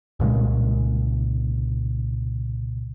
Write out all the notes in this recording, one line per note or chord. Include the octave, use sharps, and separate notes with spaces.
C2 A#2 C#3 G#3